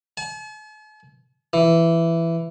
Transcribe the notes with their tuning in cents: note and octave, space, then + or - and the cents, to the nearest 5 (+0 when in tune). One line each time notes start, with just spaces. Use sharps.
A5 -45
E3 +10